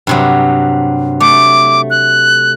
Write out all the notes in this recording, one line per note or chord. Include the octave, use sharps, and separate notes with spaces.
G2 C3 F#3
A3 D6
F#6